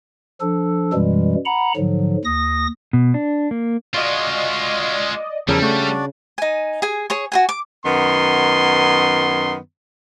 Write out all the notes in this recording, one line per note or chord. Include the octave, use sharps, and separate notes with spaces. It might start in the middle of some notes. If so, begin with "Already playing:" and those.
F3 D4 A4
F#2 B2 E3 G3 G#3
F#5 A#5 B5
G#2 D3 F3 F#3
D#2 D#6 A#6
B2
D4
A#3
G#3 F4 F#4 D5 D#5 F5
E2 C#3 F3 G3 E4 A4 A#4
A3 D4 F#4 D5
D#4 G#5
G#4 G#5
G#4 C#5 C#6
F#4 G#4 G#5
D6
F#2 D#3 B3 C6